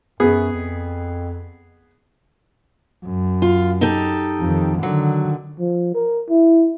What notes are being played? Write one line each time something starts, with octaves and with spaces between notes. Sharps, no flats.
F#2 B3 G#4
F2
F#2
F4
D#4 G4 A4
F2 D#3
D3 D#3 F#3
F3
A#4
E4